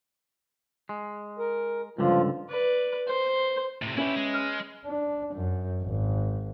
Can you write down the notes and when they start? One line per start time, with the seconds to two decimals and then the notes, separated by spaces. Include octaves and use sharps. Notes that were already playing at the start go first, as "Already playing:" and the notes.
0.89 G#3
1.39 A#4
1.98 C#2 G2 D3 F3 F4
2.49 B4 D5
3.07 C5
3.82 A2 C3
3.97 C#4 E4 G4 B4 E5
4.16 G#3
4.34 C6 F6
4.86 D4
5.35 F#2
5.82 G#1